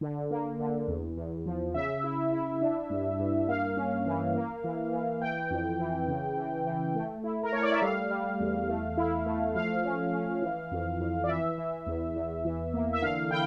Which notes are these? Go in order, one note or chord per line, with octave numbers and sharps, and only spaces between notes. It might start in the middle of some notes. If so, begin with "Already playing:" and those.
D3
A#3
D3
E2
E2
F3
C#3 E5
E4
E4
D4
G2
G2
A#3 F5
C#4
E3
A#3
E3
E3
E3 G5
F2
E3
C#3
E3
E3
A3
E4
A#4
A3 C#5
D5
E5
G3 F5
G3
E2
A3
E4
A3
F3 F5
C#4
C#4
E3
F2
F2
D5
E3 E5
E3
E2
E2
E3
A#3
E5
D3 F5
E4 G5